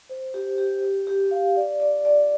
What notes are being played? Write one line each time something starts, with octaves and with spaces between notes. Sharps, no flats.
C5
G4
G4
G4
G4
F5
D5
D5
D5